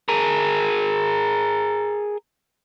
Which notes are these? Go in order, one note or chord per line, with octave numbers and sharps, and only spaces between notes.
G#4 A#4